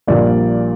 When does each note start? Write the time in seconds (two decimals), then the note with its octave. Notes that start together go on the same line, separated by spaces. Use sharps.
0.07 A#1 A#2 G3 A#3 D5